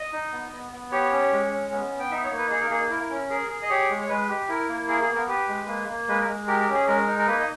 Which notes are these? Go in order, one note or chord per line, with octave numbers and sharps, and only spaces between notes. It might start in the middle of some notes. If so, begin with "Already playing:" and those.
Already playing: D#5
D#4
B3
B3
B3
G4 C#5
C#4
G#3
C#4
B3
B3
G5
D#4 E5
C#5
A#3
B4
D#4 G#4
A#4
A#3 G#4
E4 A#4
C#4
G#4 A#4
G#4
D#5
G4 C#5
G#3
C#5
G#3 B4
G4
E4 A#4
A#3
G#4 A#4
G#4
B3
A#4
G4 B4
G#3
A#3
A#3
G#3 B4
A#4
G#3
G4 A#4
A#4
C#4
G#4
G#3 A#4
D#4
A#4
A#3 B4
D#5